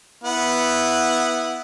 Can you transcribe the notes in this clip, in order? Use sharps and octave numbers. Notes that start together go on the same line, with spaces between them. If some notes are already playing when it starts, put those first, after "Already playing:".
B3 E4 F#5